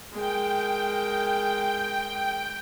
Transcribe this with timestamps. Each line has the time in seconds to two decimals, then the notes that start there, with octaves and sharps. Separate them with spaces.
0.12 G#3 A#4 G5